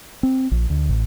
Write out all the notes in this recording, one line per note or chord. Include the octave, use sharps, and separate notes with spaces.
C4
A#1
D2
A1